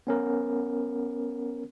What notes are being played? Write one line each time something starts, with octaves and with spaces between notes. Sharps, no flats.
B3 C#4 A#4